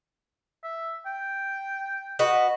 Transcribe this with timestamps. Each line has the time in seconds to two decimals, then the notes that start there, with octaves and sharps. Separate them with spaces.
0.64 E5
1.06 G5
2.19 F#4 B4 D#5